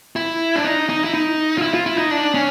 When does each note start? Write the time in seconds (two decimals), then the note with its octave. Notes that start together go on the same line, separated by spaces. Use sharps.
0.16 E4
0.56 D4
0.64 D#4
0.89 D#4
1.04 E4
1.14 D#4
1.58 F4
1.62 E4
1.74 F4
1.86 E4
1.98 D#4
2.11 D4
2.34 C#4